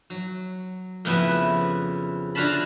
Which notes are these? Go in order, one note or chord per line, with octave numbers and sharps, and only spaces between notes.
F#3
F2 C#3 B3 E4 F#4 E5
D3 F4 F#4 F5 A5 B5